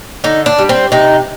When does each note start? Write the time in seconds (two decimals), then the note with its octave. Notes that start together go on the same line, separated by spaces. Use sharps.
0.24 D3 D#4
0.46 D4
0.58 G3
0.69 C4
0.92 C3 D#4